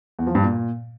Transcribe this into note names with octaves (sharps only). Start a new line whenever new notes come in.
E2
F3
G2
A#2